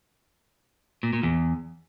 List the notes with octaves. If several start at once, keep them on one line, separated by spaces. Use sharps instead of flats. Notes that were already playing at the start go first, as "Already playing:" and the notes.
A#2
A#2
E2